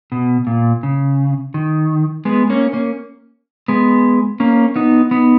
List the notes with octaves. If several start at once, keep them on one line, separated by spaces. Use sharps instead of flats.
B2
A#2
C#3
D#3
G#3 B3
A#3 C#4
A#3 C#4
G#3 B3
A#3 C#4
B3 D#4
B3 D#4